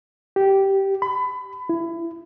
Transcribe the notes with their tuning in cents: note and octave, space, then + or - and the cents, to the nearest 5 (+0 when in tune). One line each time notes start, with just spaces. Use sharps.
G4 -10
B5 +25
E4 +25